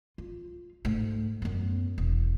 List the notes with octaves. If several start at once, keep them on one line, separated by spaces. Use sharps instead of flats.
F4
G#2 A3
F#2 B3
E1